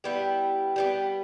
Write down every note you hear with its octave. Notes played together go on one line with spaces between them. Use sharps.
G3 B3 E4 G4
G3 B3 E4 G4